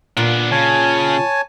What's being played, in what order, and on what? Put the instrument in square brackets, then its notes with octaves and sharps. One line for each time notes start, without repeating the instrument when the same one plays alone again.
[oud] A#2 F4 A#4 [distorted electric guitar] B3 D4
[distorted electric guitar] C#3 [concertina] C#5 G#5 A5